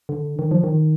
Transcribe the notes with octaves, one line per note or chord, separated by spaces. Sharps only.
D3
D#3
F3
D#3